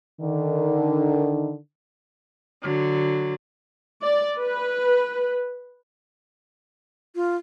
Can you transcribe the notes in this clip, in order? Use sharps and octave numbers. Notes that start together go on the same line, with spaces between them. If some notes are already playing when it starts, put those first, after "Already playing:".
D3 D#3
D3 F#3
D5
B4
F4